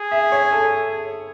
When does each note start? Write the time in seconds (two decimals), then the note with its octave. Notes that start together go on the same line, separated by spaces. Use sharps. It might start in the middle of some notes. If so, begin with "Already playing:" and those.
Already playing: G#4
0.11 E5
0.32 C#5
0.52 A4